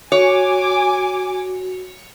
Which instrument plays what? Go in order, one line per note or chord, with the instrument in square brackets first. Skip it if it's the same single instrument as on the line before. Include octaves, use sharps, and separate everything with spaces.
[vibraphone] F#4 [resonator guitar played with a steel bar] C#5 [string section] G#5 D6